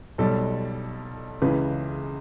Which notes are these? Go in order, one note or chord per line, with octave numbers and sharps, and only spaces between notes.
B1 B2 G3 A4
C#2 C#3 E3 B4